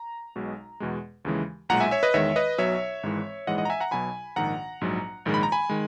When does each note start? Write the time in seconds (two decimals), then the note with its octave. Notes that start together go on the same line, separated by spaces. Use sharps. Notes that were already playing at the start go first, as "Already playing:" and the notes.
Already playing: A#5
0.36 B1 B2 G#3
0.80 E2 B2 G#3
1.25 D#2 C#3 E3 G#3
1.69 B1 A#2 G#3 F#5 A#5
1.80 E5 G#5
1.91 C#5 E5
2.03 B4 D#5
2.14 E2 D#3 G#3 C#5 E5
2.36 B4 D#5
2.58 B1 B2 F#3 C#5 E5
3.03 G#1 G#2 E3 G#3
3.47 A#1 G#2 E3 G#3 D#5 F#5
3.58 D#5 F#5
3.65 A#5
3.70 E5 G#5
3.80 F#5 A#5
3.91 B1 B2 F#3 G#5 B5
4.36 A#1 G#2 D#3 F#5 A#5
4.81 A#1 G#2 F#3
5.26 A#1 G#2 D#3 G#3
5.34 B5
5.43 A#5
5.52 G#5 B5
5.69 D#3 G#3